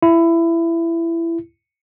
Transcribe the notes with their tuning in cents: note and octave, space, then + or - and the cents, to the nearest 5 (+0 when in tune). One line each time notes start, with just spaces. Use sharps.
E4 +20